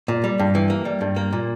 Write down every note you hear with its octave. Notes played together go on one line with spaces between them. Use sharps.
A#2
G3
G2
E3
A#3
G3
G2
A#3
A#2